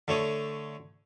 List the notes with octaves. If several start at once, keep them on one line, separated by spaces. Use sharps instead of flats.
D3 A3 C#5 D#6